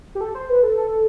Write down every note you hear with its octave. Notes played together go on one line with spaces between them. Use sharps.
G4
A4
C5
B4
A4
A4